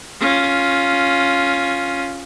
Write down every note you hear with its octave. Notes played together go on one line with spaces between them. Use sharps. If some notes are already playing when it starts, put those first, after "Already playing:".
C#4 F4